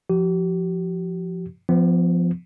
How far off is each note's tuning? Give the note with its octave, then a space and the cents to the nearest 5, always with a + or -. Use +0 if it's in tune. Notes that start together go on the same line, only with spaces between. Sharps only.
F3 +0 G4 -40
F3 +0 B3 +35